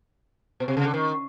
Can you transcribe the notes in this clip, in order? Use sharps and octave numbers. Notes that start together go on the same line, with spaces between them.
B2
C3
C#3
D3
D#3